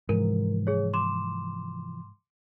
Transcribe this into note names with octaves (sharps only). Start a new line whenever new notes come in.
G#2 C3 E3 F3 A#4
G#4 C#5
C6 D6 E7